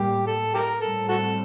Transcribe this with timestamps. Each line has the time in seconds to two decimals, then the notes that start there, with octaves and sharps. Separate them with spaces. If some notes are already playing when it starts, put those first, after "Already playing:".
Already playing: A2 G3 A#3 G4
0.27 A4
0.54 G4 A#4
0.81 A2 G3 C4 A4
1.09 F#4 A4